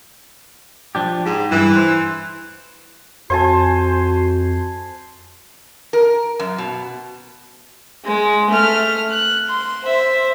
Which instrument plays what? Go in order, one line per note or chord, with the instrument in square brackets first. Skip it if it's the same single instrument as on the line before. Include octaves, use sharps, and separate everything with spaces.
[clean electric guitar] F3 D4 G4
[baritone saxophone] G#2 [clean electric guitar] G4
[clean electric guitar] G2 [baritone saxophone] E3
[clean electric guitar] C5
[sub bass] F2 [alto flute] F#4 [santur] C5 G#5 A5
[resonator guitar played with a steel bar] A#4
F#2
B2
[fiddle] G#3
A3 F6
F#6
C6
C5 E5